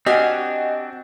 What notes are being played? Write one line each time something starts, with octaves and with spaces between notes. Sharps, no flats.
C4 D4 F#4 G4 D#5 G#5 F6